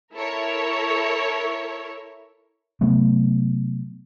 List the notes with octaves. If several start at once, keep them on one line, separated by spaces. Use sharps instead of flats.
E4 A4 A#4 C#5
C3 F#3 A3 B3